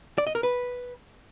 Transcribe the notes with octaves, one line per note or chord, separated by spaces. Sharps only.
D5
D#5
A#4
B4